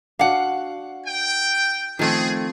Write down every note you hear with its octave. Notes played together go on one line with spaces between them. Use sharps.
D4 F#4 F5 F#5
G5
D#3 F3 A3 C4 G#4